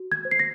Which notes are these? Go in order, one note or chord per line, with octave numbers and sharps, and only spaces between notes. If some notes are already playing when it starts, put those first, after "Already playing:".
Already playing: F#4
G#6
C5
C7
A#6